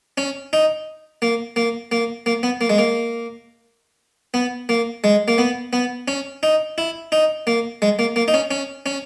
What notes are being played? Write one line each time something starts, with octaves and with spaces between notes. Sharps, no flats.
C#4
D#4
A#3
A#3
A#3
A#3
B3
A#3
G#3
A#3
B3
A#3
G#3
A#3
B3
B3
C#4
D#4
E4
D#4
A#3
G#3
A#3
A#3
D#4
C#4
C#4
C#4